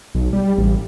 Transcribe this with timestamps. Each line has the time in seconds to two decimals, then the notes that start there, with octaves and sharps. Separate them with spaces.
0.15 B1
0.33 G3
0.58 A1